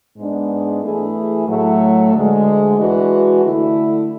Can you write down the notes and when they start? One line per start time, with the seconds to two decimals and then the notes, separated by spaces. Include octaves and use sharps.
0.17 G#2 G#3 B3 D4
0.82 E3 A3 E4 G#4
1.47 A2 F#3 A3
2.13 D2 D3 G#3
2.78 E3 G#3 D4 F#4
3.45 D3 A3 E4